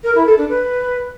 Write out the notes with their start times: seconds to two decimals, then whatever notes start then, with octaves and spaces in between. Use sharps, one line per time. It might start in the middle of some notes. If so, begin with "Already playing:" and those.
0.04 A#4
0.15 E4
0.26 A4
0.38 D4
0.49 B4